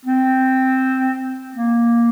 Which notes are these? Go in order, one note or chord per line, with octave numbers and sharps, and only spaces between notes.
C4
A#3